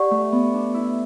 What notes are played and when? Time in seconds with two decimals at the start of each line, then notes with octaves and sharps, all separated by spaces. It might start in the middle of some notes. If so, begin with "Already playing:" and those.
Already playing: G4 D5 F#5 C#6
0.11 A3
0.32 B3
0.54 D4
0.74 E4